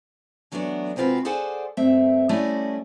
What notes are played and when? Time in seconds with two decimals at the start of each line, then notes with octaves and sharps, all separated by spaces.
0.52 E3 F#3 A3 B3 D4 F#4
0.96 C3 G#3 C4 F4 F#4 B4
1.25 G#4 A4 C5 D5 F#5 G#5
1.77 D2 G2 A3 C4 E5
2.29 G3 A3 C#4 E4 D5 D#5